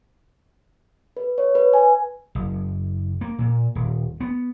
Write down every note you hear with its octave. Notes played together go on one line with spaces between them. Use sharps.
B4
C#5
B4
G#5
F#1
A#3
A#2
D#1
B3